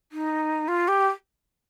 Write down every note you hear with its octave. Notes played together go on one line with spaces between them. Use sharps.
D#4
F4
G4